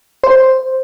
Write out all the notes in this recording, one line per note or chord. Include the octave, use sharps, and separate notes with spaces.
C5